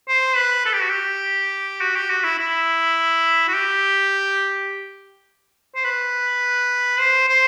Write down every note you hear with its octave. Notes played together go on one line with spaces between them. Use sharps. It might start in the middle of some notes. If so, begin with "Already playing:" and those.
C5
B4
A4
G4
F#4
G4
F#4
G4
F#4
E4
E4
F#4
G4
C5
B4
C5
C5